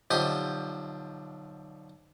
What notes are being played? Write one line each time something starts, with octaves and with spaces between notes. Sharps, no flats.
B1 D3 F3 G4 C5 D#5